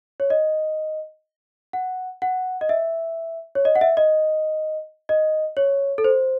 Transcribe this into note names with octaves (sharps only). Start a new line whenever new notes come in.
C#5
D#5
F#5
F#5
D#5
E5
C#5
D#5
F#5
E5
D#5
D#5
C#5
A4
C5